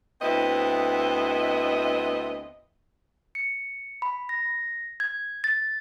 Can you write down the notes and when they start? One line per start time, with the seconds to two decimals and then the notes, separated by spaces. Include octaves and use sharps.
0.22 D2 B3 C4 E4 D#5
3.35 C#7
4.02 B5
4.29 A#6
5.00 G#6
5.44 A6